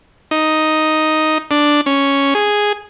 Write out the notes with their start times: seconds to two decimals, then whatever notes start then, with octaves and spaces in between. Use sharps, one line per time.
0.31 D#4
1.51 D4
1.86 C#4
2.35 G#4